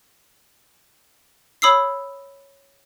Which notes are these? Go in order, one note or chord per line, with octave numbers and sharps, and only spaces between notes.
C#5 B5 D#6 E6 C7